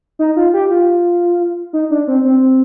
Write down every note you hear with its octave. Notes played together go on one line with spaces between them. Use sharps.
D#4
F4
G4
F4
D#4
D4
C4
C4